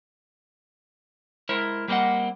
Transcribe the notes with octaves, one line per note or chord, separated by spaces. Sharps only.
G#3 E4 A#4 C5
G3 A#3 C4 D#5 F#5